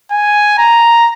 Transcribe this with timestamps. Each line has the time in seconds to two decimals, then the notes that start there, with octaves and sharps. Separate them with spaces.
0.11 G#5
0.58 A#5